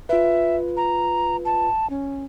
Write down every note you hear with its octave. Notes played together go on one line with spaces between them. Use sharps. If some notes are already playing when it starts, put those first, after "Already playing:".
F4 B4 E5
A#5
A5
C#4